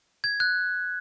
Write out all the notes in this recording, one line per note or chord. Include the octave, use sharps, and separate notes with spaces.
G#6
F#6